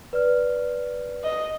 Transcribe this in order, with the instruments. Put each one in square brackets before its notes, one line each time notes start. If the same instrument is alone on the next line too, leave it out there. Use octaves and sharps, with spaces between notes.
[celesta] B4 D5 F6
[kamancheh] D#5